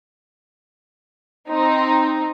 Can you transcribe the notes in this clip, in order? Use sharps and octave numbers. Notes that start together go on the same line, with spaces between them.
C4 D#4